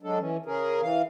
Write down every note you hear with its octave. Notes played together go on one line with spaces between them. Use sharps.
F#3 G#3 D4 A4
E3 C#4
C#3 C#4 G#4 A#4
E3 F5